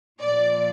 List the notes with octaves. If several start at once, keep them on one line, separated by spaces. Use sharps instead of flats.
A#2 F3 D5